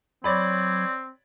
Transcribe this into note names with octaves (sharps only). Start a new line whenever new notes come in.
F#3 C4 C#5 D5 B5 G#6